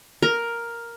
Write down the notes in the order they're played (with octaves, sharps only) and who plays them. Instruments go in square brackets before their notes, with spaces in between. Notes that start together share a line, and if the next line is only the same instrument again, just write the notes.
[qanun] A#4